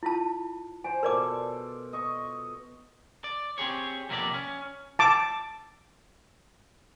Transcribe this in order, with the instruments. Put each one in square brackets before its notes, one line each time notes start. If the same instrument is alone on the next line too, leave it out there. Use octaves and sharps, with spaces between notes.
[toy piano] E4 F4 A5
[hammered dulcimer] C5 D5 [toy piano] G#5
[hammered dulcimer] B2 F4 A4 [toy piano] A#4 D5 D6
[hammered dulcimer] D#5 C#6
[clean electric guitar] D5
C4 G4 G#4 C#5
F2 C3 A#3 B3 D5
C#4
[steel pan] A5 D6